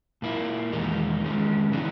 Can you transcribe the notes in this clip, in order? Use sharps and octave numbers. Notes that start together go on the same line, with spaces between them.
A#2 A#3 E4
E2 D#3 G#3 D#4
D#3 G#3 C#4
C#3 E3 G#3 B3 D#4